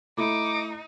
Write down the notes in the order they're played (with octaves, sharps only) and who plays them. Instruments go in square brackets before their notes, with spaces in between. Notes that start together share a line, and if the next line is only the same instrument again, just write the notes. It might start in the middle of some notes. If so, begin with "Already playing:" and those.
[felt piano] A3 E4 [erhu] D#4 [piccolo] D6